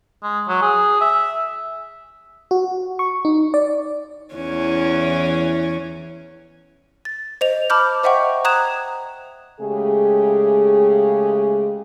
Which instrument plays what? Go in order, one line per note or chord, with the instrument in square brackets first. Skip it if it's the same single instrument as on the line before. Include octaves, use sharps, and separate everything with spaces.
[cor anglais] G#3
F#3
G#4
E5
[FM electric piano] F#4
C#6
D#4
D5
[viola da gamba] E2 E3 C#4
[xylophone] A6
C5 D#5 F7
A5 B5 D6 F6 G6
C5 D#5 E5 F#5 G5 C#6
A#5 D#6 F#6 G#6 E7
[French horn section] C#3 G#3 A3 G4 G#4